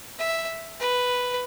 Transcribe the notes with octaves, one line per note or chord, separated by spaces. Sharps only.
E5
B4